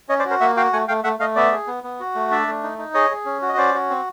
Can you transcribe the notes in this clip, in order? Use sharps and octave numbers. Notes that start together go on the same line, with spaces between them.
C#4 C#5 D#5
C5 D5
F#4
A#4 C5
A#3 E5 F#5
F#4 F5 G5
A3 F#5 G#5
A3 F5 G5
A3 E5 F#5
A3 D#5 F5
B3 D5 E5
G#4
B3
B3
F#4
A3
D4 D5 E5
A3
D#4
D#4
G#4 C#5 D#5
G#4
C#4
F#4
D#5
C#4 C5 D5
F#4
C4